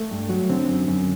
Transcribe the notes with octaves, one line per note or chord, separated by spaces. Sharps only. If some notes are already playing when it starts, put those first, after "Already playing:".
Already playing: A3
G2
F#3
D3 C4
F#2
F#2